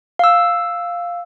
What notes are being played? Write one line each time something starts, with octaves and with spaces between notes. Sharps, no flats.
F5 E6